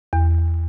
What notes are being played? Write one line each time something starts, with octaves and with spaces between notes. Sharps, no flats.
E2